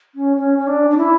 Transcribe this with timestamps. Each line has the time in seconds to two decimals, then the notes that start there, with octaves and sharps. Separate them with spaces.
0.15 C#4
0.37 C#4
0.58 C#4
0.67 D4
0.90 D4
0.98 E4